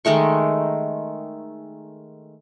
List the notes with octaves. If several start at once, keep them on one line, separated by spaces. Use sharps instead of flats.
D#3 G#3 A3 C#6